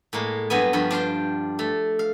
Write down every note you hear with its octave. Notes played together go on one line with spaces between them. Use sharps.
A2 G#3 A#3
G2 F#3 A#3 B3 G#5
G2 F3 B4 C#5
D4 C5 F5 G5
A3
F5